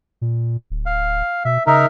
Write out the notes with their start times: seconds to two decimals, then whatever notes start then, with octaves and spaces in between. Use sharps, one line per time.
0.21 A#2
0.70 D1
0.86 F5
1.45 B2 E5
1.67 C#3 D#4 A#4 E5